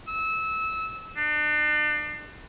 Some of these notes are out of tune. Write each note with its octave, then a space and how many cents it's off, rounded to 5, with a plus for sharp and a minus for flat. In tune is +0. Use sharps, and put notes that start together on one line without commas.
E6 -20
D4 +35